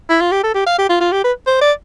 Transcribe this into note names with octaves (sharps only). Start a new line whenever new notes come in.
E4
F4
G4
A4
G4
F5
G4
F4
F4
G4
B4
C5
D5